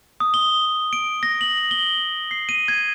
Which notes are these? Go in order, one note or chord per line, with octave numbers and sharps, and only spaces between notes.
D#6
G7
D7
A#6
F#7
G7
C7
D#7
G#6